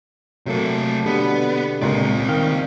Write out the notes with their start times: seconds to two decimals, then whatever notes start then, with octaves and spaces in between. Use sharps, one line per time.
0.46 C3 F#3 A3 A#3 A4
1.06 B2 D3 G3 B3
1.82 C#2 A#2 C4 D5
2.28 D#3 F5 G5